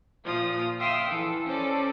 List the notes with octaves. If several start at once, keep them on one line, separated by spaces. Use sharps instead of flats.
A#2 F3 F4 D#6
E5 F5 G5 C6 D#6 E6
E3 A4
C#4 A4 C5 D5